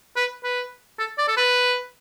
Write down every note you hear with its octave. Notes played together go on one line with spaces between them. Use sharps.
B4
B4
A4
D5
A4
B4